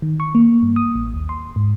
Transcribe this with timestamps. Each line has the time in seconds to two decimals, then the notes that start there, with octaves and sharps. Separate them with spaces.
0.02 D#3
0.20 C#6
0.35 A#3
0.63 G2
0.76 D#6
0.95 A1
1.14 D#2
1.29 C6
1.56 G#2